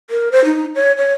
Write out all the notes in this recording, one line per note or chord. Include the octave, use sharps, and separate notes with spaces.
A#4
C5
D#4
C#5
C#5